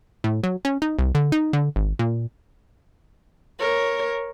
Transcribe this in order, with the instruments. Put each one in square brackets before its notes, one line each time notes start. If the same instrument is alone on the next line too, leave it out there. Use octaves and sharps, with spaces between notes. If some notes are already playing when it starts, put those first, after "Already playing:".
[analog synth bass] A2
F#3
C#4
D#4
C2
D3
D#4
D3
G#1
A#2
[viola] A#4 C#5